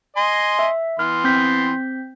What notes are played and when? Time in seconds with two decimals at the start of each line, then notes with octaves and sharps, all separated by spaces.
0.17 D#5 G#5 C6
0.59 E5
0.99 E3 B3 C6 F6
1.24 C4 G6 B6